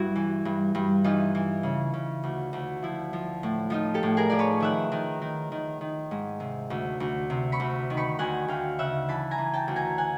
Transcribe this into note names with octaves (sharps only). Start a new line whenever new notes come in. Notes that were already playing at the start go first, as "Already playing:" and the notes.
Already playing: G2 E4 F#4
E3
G2
G2
E3 D#4 F4
E3
C#3
C#3
D2
D2
F3 E4
F3
A2
F3 D#4 F4
G4 A4
A2
G#4 A#4
F3 D5
B4 C#5
D#3 E5 F#5
D#3
D#3
D#3
D#3
G#2
C3
D2
D2
C3
B5 C#6
D2
D#3
B5 C#6
D2 F#5 G#5
D2 F5 G5
C#3 E5 F#5
E3 A5 B5
G#5 A#5
E3
G5 A5
D2
G#5 A#5
F#5 G#5